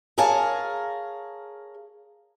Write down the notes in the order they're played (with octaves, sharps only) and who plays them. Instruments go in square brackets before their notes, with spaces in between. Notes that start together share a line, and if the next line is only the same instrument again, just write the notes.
[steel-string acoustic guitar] G#4 A#4 C#5 F5 G#5 A5